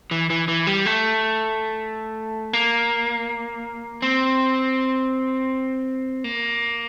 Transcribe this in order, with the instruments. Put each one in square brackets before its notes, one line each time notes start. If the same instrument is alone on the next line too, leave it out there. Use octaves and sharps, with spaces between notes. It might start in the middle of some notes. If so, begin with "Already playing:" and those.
[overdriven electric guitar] E3
E3
E3
G3
A3
A#3
C4
A#3